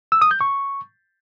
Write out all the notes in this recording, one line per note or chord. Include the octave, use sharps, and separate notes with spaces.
E6
D#6
G6
C#6